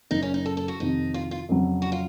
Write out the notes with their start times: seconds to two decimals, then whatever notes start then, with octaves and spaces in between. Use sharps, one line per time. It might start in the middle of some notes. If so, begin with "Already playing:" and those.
0.11 F#1 F#2 C#3 D#4
0.22 C#4
0.34 D#4
0.46 A4
0.57 A4
0.68 F#4
0.80 F2 C3 D#3 D#4
1.14 F4
1.31 F4
1.49 F2 C#3 F#3
1.82 F#4
1.92 F4